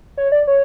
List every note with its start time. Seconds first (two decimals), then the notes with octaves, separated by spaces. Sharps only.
0.17 C#5
0.32 D5
0.47 C#5